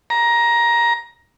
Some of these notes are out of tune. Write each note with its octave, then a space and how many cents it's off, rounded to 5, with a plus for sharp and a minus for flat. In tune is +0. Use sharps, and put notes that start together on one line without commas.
A#5 +15